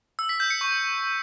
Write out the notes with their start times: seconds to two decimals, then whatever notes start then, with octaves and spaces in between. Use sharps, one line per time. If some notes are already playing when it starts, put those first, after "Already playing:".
0.19 E6
0.29 B6
0.40 G6
0.50 C#7
0.61 C#6